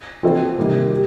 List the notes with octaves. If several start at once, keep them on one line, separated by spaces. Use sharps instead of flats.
F3 C4 F4 A4 C5
C3 D#3 G3 A#3
G4